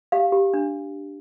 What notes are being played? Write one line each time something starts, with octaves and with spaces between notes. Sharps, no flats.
G4 F5
G4
D4